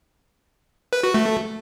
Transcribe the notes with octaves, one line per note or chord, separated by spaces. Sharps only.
B4
F#4
A3